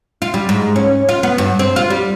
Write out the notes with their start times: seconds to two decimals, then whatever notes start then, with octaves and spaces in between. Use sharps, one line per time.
0.22 F4
0.34 G3
0.49 G#2
0.76 C#4
1.09 F4
1.23 B3
1.38 G2
1.59 C4
1.76 F4
1.90 G3